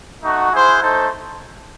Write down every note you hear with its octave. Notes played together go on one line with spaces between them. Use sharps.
A3 D#4 F#4
E4 G#4 C5 F#5
A3 D#4 A4 C5